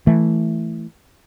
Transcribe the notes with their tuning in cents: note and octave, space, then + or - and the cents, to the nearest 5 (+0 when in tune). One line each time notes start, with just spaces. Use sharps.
E3 +0 A3 +0